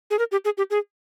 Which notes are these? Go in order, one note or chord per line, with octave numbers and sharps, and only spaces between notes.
G#4
A#4
G4
G#4
G4
G#4